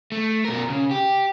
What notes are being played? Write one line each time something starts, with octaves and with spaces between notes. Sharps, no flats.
A3
B2 A#4
C#3
G4